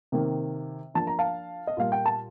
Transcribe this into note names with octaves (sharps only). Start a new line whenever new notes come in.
C3 D#3 A#3
F3 A#3 D4 A5
A#5
F5 A5
D#5
A#2 G3 A#3 F4 F5
G5
A5